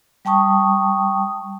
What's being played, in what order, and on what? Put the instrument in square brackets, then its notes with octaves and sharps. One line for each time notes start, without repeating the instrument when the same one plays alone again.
[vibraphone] G3 G5 A5 C#6 D#6